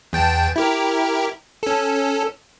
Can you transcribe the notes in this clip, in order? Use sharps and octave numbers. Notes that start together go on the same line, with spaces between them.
E2 G5 A5
E4 G4 A#4
C#4 A4